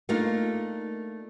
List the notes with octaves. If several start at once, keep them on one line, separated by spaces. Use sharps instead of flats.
A3 A#3 D4 D#4 F4